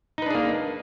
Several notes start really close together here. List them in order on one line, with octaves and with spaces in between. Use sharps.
D#4 B4 D4 G#4 A#3